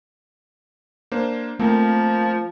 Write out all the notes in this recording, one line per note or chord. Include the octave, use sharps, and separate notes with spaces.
A#3 D4 C5
F3 A3 A#3 C4 A#4